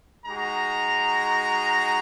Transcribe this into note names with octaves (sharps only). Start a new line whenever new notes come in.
G#3 D#4 F#4 A#5